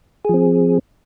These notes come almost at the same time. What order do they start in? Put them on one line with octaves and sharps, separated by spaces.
G#4 F3 C4